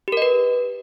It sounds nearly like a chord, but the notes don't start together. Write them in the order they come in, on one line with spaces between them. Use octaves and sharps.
G4 A#4 D#5 B4